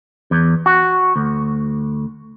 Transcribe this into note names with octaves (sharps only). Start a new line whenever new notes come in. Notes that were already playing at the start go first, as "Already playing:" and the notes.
E2
F#4
D2